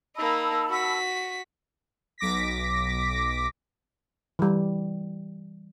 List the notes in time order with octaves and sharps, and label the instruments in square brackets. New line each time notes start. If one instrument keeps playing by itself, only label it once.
[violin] A#3 D#4 [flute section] A5 B5 E6
[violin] F#4 B6
[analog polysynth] B1 D6 A#6 B6
[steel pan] E3 G3